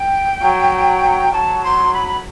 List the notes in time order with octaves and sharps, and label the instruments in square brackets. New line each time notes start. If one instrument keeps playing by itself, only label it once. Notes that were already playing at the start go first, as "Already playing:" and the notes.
Already playing: [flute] G5
[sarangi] F#3
[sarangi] F#3 [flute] A5
[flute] C6
B5
B5